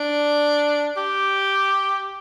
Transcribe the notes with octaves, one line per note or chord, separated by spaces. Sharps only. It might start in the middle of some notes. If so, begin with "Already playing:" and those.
Already playing: D4
G4